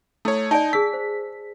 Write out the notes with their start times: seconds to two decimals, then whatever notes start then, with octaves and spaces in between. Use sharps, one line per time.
0.25 A3 E4 C#5 D#6
0.51 D#4 D5 G#5 A5
0.73 G#4 E6 B6
0.93 C5